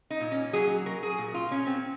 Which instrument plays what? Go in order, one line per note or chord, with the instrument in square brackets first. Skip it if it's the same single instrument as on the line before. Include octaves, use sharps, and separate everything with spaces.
[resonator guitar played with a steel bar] D#4
A#2
C#4
F#3 G#4
F#3 A#4
G#4
A#2
F4
A#2 C#4
C4